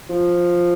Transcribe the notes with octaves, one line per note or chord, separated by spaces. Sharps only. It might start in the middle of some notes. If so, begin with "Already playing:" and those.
F3